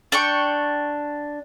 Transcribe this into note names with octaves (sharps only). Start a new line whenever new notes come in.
D4 G5 C#6